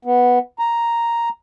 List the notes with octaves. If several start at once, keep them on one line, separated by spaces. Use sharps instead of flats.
B3
A#5